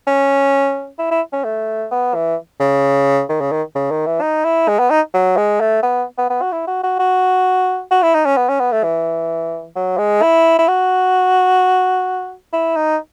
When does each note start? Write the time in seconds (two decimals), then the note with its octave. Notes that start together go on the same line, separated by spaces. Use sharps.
0.07 C#4
0.99 E4
1.11 E4
1.33 C#4
1.44 A3
1.91 B3
2.15 E3
2.60 C#3
3.29 D#3
3.41 C#3
3.52 D#3
3.75 C#3
3.91 D#3
4.06 E3
4.21 D#4
4.45 E4
4.68 G#3
4.79 B3
4.90 D#4
5.14 F#3
5.37 G#3
5.61 A3
5.83 B3
6.18 B3
6.30 B3
6.42 F#4
6.52 E4
6.67 F#4
6.83 F#4
6.99 F#4
7.91 F#4
8.03 E4
8.14 D#4
8.25 C#4
8.37 B3
8.49 C#4
8.60 B3
8.72 A3
8.84 E3
9.76 F#3
9.98 G#3
10.22 E4
10.59 E4
10.68 F#4
12.53 E4
12.76 D#4